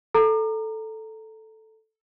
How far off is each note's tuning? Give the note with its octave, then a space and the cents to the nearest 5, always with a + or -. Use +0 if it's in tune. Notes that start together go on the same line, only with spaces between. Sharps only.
A4 +0 A#5 -10